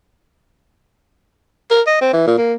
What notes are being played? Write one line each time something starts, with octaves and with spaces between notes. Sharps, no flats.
A#4
D#5
C4
E3
A#2
A#3